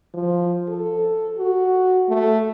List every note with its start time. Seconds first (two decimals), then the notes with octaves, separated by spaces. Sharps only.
0.14 F3
0.69 A4
1.38 F#4
2.09 A3